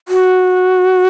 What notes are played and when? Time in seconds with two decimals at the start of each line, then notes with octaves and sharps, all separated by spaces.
0.08 F#4